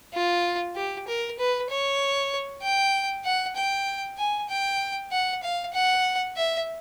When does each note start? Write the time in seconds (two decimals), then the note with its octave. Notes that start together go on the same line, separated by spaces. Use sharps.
0.13 F4
0.76 G4
1.08 A#4
1.39 B4
1.70 C#5
2.62 G5
3.25 F#5
3.56 G5
4.18 G#5
4.50 G5
5.12 F#5
5.43 F5
5.74 F#5
6.37 E5